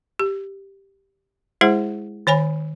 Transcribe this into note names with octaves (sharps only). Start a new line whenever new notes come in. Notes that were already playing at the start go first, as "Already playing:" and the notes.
G4
G#3 E4 G#4 C5 F#5
D#3 C#5 G#5 B5